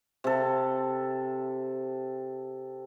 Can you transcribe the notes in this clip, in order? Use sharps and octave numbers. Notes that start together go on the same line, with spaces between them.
C3 A4